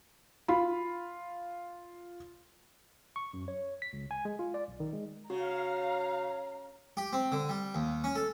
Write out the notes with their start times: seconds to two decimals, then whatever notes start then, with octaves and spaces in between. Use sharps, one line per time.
0.48 F4 B5
3.16 C#6
3.33 F#2
3.48 C#5
3.82 B6
3.93 C#2
4.11 G#5
4.25 G#3
4.39 F4
4.54 D5
4.68 B1
4.80 D#3
4.93 G#3
5.30 C#3 F#4 F5 A#5
6.97 G4
7.13 C4
7.32 D3
7.49 G3
7.75 D#2
8.04 C#4
8.16 A4